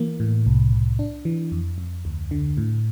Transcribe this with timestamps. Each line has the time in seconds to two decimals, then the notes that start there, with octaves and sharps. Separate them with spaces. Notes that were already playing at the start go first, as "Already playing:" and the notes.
Already playing: E3 A#3
0.20 A2
0.46 C2
0.73 C2
0.99 D4
1.25 E3
1.52 F2
1.78 F2
2.05 D2
2.31 D3
2.58 A2